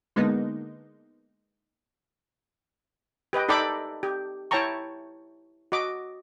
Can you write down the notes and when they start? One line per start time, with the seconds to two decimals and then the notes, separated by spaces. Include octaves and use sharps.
0.16 D3 G#3 A#3 B3 D#4
3.33 G4 B4 D#5 G5
3.49 D#4 A4 D5 G5 B5 D6
4.03 G4
4.51 E4 C#5 G5 A5 A#5 C#6
5.72 F#4 D#5 D6